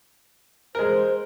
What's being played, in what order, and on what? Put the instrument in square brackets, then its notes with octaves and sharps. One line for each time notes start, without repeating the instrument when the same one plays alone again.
[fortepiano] G#3 A#4 [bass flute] C5